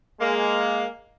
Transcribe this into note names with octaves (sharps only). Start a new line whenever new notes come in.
G#3 A#3